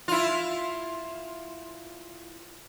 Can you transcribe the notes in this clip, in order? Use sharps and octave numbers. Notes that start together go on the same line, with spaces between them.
E4 F4